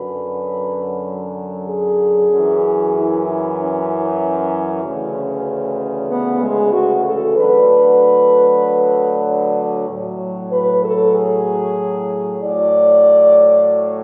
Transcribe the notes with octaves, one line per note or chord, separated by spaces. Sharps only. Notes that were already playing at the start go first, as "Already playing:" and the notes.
Already playing: F#2 D3 F#3 B4
G#4
F#2 E3
E4
E4
C#4
D2 C#3 E3
B3
G#3
F#4
A4
D2 D3 F#3 B4
C#5
D5
A2 F#3
B4
A4
G#4
A2 F#3 D5
C#5